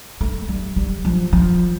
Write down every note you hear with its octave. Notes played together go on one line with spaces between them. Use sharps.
A3
G3
G3
F3
F3